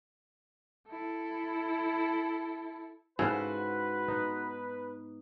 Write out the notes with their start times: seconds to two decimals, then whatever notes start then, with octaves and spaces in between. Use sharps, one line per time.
0.89 E4 A4
3.19 G#2 C#3 E4 F#4 A4 B4 C5
4.08 B3 D#4